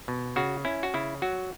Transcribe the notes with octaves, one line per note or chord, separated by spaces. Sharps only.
B2
C#3 F#4
C#4 E4
F#4
C#3 E4
F#3 F#4